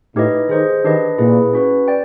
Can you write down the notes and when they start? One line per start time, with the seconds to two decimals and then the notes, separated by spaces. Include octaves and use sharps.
0.15 A2 D#4 G4 B4 D#5
0.49 D#3 G#4 C5 D#5
0.84 D#3 D4 G4 B4 D#5
1.18 A#2 E4 G#4 B4
1.53 C#4 F#4 B4
1.88 D5 G5